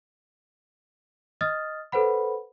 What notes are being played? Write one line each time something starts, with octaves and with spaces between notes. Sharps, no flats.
D#5 D#6 F6 A6
A4 B4 C5 F#5 B5